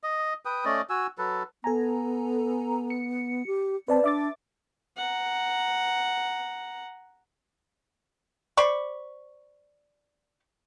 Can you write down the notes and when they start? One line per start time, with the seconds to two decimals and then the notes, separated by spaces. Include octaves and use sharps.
0.03 D#5
0.45 B4 G5 D#6
0.65 A3 C#4 D5 D#5
0.90 F#4 G#5 E6
1.18 F#3 A4 B4
1.64 B3 A4 G#5 A#5
2.90 C#7
3.47 G4
3.88 C4 B4 D5 A5
4.04 D4 E5 D6 A6
4.97 F#5 A#5
8.57 C5 D5 B5 C#6